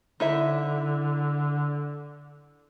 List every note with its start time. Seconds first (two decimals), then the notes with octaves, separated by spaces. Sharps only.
0.20 D3 D#4 E4 E5